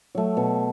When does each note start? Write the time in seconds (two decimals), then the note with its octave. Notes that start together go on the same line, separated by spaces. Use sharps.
0.15 F#3 A3
0.37 B2